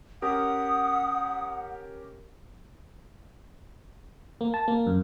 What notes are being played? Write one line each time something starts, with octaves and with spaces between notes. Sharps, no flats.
C#4 G4 A#4 F#5 D#6
A#3
A5
A#3
F#2